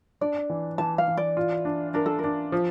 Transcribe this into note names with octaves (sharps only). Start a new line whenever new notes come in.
D4 D5
E3
E3 A5
F5
E3
D5
F4
D4
D4 A#4
A4
A#4
D4
F3